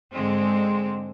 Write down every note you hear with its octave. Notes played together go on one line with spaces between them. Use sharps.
G#2 D3 G#3 C4